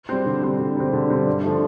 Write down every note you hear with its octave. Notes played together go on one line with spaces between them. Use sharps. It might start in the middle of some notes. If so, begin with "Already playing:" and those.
G3 C4
D3
G3 C4
D3
G3 C4
D3
G3 C4
G2
D3 F3 A3